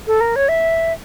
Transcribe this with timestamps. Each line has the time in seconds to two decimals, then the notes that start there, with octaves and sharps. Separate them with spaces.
0.07 A4
0.21 A#4
0.36 C#5
0.49 E5